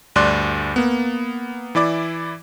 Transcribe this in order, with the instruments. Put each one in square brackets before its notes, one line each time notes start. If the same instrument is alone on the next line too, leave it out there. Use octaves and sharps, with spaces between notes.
[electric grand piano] D2 G2 D4 D5 C6 F#6
A#3 B3
E3 E4 D5 D6